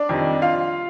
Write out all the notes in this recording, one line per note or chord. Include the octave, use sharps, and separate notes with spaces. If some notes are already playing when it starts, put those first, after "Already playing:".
Already playing: D4 D5
F2 C3 D#3 G3
F4 F5